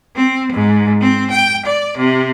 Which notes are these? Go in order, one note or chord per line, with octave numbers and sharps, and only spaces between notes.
C4
G#2
C4
G5
D5
C3